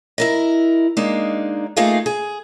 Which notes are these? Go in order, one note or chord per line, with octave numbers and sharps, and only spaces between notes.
E4 A#4 D#5
G#3 A#3 D4 D#4
A3 A#3 D#4 F4 G#4 F5
G#4